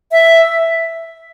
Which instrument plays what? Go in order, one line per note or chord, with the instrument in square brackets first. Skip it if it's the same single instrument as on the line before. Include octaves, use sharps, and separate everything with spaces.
[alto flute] E5